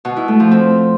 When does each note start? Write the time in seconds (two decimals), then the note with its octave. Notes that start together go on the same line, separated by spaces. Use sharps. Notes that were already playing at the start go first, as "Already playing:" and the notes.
0.05 B2
0.16 E4
0.28 A3
0.40 F3
0.51 C4